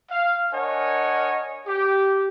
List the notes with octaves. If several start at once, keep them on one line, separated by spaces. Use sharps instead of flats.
F5
D4 A#4 C#5 D#5 F#5 G#5
G4